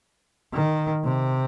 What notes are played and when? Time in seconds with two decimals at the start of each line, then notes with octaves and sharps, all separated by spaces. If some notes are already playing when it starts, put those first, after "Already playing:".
0.54 D#3
1.04 C3